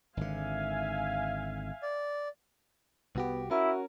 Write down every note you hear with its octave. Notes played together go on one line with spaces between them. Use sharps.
G#1 D3 E5 F5 G#5
D5
C2 B3 F#4 G4
C#4 E4 F#4 A#4